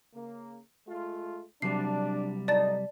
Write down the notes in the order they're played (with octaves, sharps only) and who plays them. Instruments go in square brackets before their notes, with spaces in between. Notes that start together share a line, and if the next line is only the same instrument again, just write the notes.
[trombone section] C#3 A#3
G#3 A3 F4
[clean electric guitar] C3 F#3 G3 [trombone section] D4 [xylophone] C7
[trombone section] F#2 A2 D#4 [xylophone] D5 A5 A6